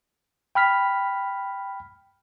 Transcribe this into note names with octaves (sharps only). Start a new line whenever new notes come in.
G5 B5 F6 B6